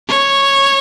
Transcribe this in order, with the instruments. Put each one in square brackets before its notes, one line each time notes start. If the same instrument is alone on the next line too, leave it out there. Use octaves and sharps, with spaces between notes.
[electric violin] C#5